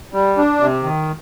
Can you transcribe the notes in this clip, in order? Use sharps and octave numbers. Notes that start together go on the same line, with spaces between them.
G3
D4
C3
D#3